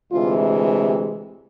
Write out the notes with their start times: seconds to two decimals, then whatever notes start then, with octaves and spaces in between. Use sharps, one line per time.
0.11 D2 C3 E3 G#3 F4
0.86 G4